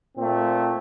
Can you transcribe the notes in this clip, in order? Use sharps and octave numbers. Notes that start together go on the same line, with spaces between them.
A#2 A3 C4